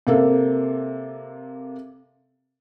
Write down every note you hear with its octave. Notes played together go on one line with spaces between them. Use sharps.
C3 A#3 A4